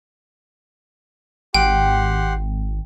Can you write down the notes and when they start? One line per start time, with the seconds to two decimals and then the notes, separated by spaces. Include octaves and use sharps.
1.55 G#1 G4 F#5 G5 C6